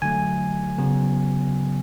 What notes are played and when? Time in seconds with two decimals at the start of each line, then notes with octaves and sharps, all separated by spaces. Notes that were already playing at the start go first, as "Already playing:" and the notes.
0.02 D3 F#3 A3 G#5
0.78 C#3 F#3 B3